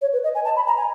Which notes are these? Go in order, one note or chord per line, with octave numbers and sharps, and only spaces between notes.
C#5
B4
D#5
G#5
A5
B5
A#5
G#5